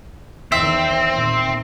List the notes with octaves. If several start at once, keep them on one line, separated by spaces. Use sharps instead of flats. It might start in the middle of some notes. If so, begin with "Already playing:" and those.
E2 D#3 C4 E5
A#2 D#3